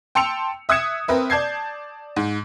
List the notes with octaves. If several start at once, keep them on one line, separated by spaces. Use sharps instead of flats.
G5 A5 C6 E6 C#7 F7
E5 D#6 F#6 G#6 C#7 E7
C4 A#4 B4 E5
D5 A5 G6 G#6 C7
G#2